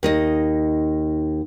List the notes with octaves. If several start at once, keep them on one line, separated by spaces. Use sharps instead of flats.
D#2 D#4 D#5